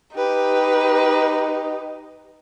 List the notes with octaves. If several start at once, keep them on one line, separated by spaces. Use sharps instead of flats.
D#4 G4 B4